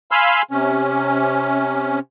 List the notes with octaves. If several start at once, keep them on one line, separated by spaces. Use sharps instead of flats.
F5 G#5 B5 C6 E6 F6
C3 C#4